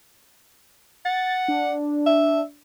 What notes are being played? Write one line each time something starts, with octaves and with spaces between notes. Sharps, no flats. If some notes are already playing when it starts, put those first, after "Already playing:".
F#5 A6
D4
E5